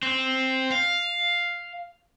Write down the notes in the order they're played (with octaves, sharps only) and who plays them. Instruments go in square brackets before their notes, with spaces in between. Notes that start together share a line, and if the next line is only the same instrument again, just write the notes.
[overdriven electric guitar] C4
F5